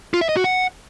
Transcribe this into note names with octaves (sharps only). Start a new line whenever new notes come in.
F4
E5
D#5
F#4
F#5